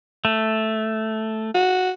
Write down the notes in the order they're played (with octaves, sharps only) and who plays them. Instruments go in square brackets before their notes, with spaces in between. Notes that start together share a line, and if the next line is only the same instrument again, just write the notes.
[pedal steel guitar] A3
[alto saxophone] F#4